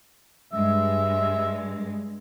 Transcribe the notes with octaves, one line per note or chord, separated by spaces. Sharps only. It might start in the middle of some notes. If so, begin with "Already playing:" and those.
G2 G#3 E5